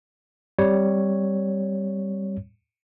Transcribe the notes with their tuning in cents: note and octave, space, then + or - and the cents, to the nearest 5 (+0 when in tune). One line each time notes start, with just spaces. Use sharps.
G3 +0 C4 +10 C#5 +0